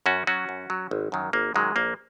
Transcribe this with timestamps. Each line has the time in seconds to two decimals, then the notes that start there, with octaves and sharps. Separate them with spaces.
0.06 F#2 C#4 F#4
0.27 F#3 C#4 F#4
0.49 F#2
0.70 F#3
0.91 G#1
1.12 F#2 D#3 F#3
1.33 G#1 A#3
1.54 F#2 D#3 F#3 G#3
1.76 A#1 A#3